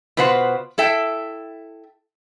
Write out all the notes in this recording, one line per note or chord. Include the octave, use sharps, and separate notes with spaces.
B2 F4 B4 C5 F#5
E4 A4 E5 G5